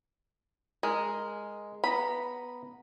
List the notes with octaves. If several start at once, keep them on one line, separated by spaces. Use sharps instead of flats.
G#3 A#4
B3 A#5 B5